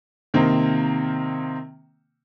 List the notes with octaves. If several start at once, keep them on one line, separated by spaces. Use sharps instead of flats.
C3 D#3 A#3 C4